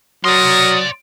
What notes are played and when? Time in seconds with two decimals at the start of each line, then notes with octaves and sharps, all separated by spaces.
0.25 F#3 A#4 D5 C6 D#6